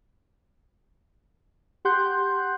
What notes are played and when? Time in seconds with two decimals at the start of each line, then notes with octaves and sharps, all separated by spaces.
1.85 G4 F#5 C6 F#6 G6